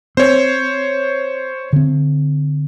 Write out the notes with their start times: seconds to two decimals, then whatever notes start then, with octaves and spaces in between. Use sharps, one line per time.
0.17 C4 C5 C#5
1.73 D3 C4